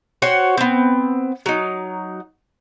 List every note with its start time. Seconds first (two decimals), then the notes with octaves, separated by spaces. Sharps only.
0.22 F#4 C5 C#5 F#5
0.57 B3 C4
1.46 F#3 D#4